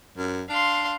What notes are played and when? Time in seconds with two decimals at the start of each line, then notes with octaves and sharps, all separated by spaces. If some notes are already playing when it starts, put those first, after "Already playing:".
0.17 F#2
0.49 D4 F5 C6